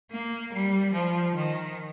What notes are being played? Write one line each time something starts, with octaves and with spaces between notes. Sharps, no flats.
A#3
G3
F3
D#3